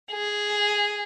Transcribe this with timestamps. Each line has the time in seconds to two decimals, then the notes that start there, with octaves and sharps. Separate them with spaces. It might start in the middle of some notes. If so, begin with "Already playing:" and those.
0.11 G#4